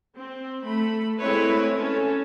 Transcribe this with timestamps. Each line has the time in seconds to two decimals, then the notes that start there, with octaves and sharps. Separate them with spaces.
0.15 C4
0.66 A3 B5
1.18 G#3 A3 C4 E4 B4 C#5
1.74 C#4 A4